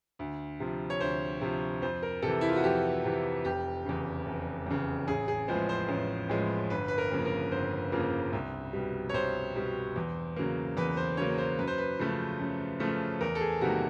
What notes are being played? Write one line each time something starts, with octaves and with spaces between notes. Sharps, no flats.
D2
C3 F3
C#5
D2 C5
C3 F3
F2 C5
A#4
C3 A4
E3
E4
F4
F#4
F2 G4
C3 E3
F1 G4
E2 C#3
F1
E2 C#3
A1 G#4
G#4
A2 F3 G#3 B3 C5
C5
A1
A2 F3 G#3 B3
G1 B4
B4
A#4
F2 C#3 F3 A#3
A#4
G1 C5
F2 C#3 F3 A#3
C2
B2 G3
C#5
C2 C5
B2 G3
E2
C#3 F#3 A#3
E2 B4
C5
C#3 F#3 A#3 C#5
C5
F#2 B4
C5
B4
C#3 F3 A3
F#2
C#3 F3 A3
E2 A#4
A4
G#4
C3 D#3 G3 A#3 F#4